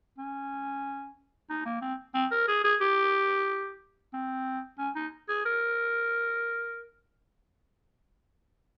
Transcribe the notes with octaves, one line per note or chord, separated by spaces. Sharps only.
C#4
D#4
A#3
C4
C4
A#4
G#4
G#4
G4
C4
C#4
D#4
G#4
A#4